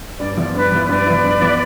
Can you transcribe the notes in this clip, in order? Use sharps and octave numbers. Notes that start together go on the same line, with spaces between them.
G2 D5
F3 B3 E4 D5
G2 B4 D5
F3 B3 E4
G2 B4 D5
F3 B3 E4
G2
F3 B3 E4